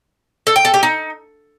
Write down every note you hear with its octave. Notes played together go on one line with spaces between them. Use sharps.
A4
G5
A4
G4
D#4